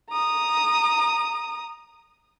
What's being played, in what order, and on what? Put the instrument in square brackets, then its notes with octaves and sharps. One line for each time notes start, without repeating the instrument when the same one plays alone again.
[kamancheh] A#5 D#6